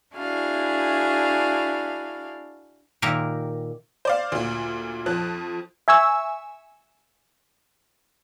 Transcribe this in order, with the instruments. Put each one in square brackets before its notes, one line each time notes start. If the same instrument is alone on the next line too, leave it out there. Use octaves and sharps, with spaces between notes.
[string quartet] D4 E4 F#4 G#4 F5
[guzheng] A#2 D#3 G4 A#4 E5 A#5
[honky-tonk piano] C5 D5 F5
D2 A#2
F2 F3 F#6
[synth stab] E5 G#5 C#6 E6